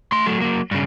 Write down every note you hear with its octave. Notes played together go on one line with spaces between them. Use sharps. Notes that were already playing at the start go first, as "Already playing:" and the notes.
A3 C6
F#3 A3
F#3 A#3
G2 C#3